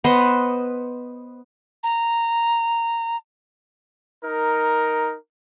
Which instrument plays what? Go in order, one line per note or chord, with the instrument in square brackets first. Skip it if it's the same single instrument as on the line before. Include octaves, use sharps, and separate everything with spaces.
[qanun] B3 B4 C5 D#5
[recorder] A#5
[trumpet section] D#4 A#4